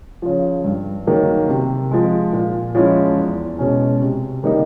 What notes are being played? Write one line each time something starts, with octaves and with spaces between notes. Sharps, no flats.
C#3 F3
G2
D#3 F#3 A#3
C3
F3 G#3
A#2
F3 G#3 C#4 E4
E2
B2 G#3 C#4
C3
D#3 G3 A#3 D#4